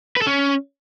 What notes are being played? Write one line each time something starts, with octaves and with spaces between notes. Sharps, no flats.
B4
A4
C#4